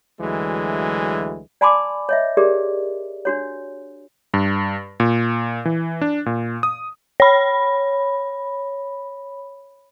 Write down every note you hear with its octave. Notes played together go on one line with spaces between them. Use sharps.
D2 E3 F#3 G#3
D5 G#5 A5 B5 C6 D6
C#5 D#5 E5
G4 G#4 A#4 D5
D4 F#4 C#5
G2
A#2
E3
D4
A#2
D#6
C#5 B5